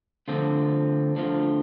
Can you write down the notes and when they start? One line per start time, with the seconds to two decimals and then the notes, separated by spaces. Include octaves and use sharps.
0.28 D2 D3 F3 C4 F4
1.16 D2 D3 F3 C4 F4